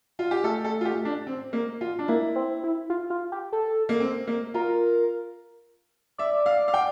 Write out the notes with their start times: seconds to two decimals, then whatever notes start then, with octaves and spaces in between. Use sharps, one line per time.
0.19 F4
0.31 G4
0.43 A3 A4
0.64 A4
0.81 F4
0.85 G4
1.05 D4
1.27 C4
1.53 A#3
1.81 F4
1.99 D4
2.08 A#3 E4
2.36 C4
2.64 E4
2.90 F4
3.10 F4
3.32 G4
3.52 A4
3.89 A#3
4.00 C4
4.27 A#3
4.54 F4 A#4
6.18 D5 E5
6.46 F5
6.68 F5
6.74 G5